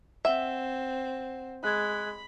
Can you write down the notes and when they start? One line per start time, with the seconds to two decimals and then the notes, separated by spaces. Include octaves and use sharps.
0.25 C4 E5 F#5 E7 G7
1.64 G#3 B5 F#6 G#6